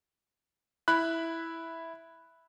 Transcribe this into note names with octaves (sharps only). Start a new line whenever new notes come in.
E4 B5 F#6